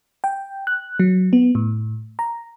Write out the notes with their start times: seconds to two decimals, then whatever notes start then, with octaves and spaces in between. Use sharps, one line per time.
0.24 G5
0.67 F#6
0.99 F#3
1.33 B3
1.55 A2
2.19 A#5